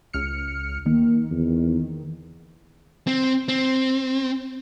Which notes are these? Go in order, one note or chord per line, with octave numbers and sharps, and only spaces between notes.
C#2 F6 C#7
D#3 A#3
E2
C4
C4